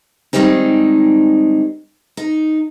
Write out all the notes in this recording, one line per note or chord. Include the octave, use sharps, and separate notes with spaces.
D#3 G3 G#3 C4 D#4
D#4